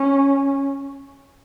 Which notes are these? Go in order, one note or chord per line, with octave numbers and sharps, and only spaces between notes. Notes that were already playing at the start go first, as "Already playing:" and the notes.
Already playing: C#4